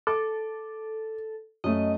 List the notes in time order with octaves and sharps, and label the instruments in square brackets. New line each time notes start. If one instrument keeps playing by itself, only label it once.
[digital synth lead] A4 [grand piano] D6
[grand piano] F#2 A3 [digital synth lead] D#5